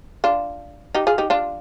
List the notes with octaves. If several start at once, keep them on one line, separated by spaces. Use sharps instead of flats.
D4 F4
D#4 G4
F4 G#4
D#4 G4
D4 F4